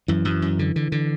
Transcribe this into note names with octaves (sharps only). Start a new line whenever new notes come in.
F#2 E3
F#2
F#2
D3
D3
D3